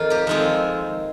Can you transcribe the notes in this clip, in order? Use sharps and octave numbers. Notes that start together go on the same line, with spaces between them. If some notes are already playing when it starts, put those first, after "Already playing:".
Already playing: F2 D#3 A#3 F4
G4 A#4
F2 D#3 G#3 C4 F4 G#4